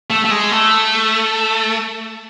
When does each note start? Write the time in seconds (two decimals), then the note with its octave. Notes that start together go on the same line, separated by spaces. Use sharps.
0.10 A3
0.25 A3
0.31 G#3
0.51 A3